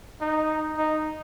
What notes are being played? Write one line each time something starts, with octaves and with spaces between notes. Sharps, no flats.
D#4
D#4